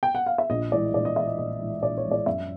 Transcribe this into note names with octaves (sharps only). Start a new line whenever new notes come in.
G5
F#5
F5
E5
A#1 D#5
A2 E3 G#3 D5
A#1 D5
D#5
A2 E3 G#3 E5
D#5
A#1 D#5
A2 E3 G#3
A#1 D5
C#5
A2 E3 G#3
D5
F#2 E5